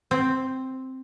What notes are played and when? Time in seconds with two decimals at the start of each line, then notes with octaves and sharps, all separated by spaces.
0.11 C4